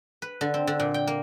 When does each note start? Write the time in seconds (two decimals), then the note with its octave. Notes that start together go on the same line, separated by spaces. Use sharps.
0.22 B4
0.41 D3
0.54 C4
0.67 D3
0.80 A#2
0.94 G5
1.07 A#3